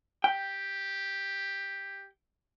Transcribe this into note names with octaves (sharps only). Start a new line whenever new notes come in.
G4 G5